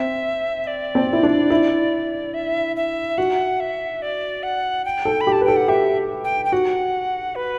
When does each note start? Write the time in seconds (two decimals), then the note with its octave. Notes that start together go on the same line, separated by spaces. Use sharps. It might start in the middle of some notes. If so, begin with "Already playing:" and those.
Already playing: C4 E5
0.67 D5
0.95 C4
1.13 E4
1.23 D4
1.50 E4
2.34 E5
2.76 E5
3.18 F#4 F#5
3.60 E5
4.02 D5
4.43 F#5
4.85 G5
5.05 A4
5.21 B5
5.27 G4
5.32 A5
5.41 B4
5.44 A4 G5
5.56 F#5
5.68 G4 E5
6.24 G5
6.45 G5
6.52 F#4 F#5
7.35 B4